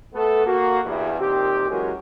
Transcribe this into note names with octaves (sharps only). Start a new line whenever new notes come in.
A3 B3 A4
A#3 F#4
E2 G2 E3
A#2 D#3 C4 G4
E3 F#3 G#3 C#4 F#4 A#4